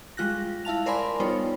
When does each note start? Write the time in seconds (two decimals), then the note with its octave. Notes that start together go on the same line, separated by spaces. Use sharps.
0.17 G3 G#3 F4 F#6 A#6
0.65 E4 F5 A5 F7
0.86 A#4 C5 D5 G#5 B5 C6
1.20 G3 B3 D#4 F4 C5 C#5